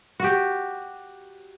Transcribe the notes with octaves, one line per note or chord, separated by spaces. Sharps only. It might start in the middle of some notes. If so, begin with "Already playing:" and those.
F#4 G4